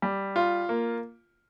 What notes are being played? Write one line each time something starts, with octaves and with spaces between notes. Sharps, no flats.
G3
F4
A#3